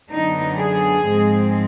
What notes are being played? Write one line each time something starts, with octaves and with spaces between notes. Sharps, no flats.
F#2 D3 F#3 B3 D4 D#4
G#4
G#2 F3 G#3 C4